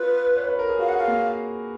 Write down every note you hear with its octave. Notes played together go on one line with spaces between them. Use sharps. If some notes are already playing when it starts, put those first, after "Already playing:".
Already playing: F4 B4
C#5
B4
A#4
G#4
F#4 F5
F#5
G#4
F5
A#3